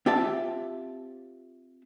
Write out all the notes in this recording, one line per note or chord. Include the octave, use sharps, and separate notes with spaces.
C4 F4 G4 E5 F#5 A5